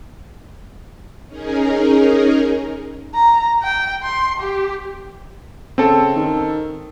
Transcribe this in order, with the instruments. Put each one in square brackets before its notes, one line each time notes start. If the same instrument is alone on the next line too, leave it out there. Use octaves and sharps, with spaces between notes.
[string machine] C#4 D#4 G#4 A#4
[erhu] A#5
G5
C6
G4
[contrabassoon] C#3 [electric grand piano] C4 A4
[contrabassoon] D#3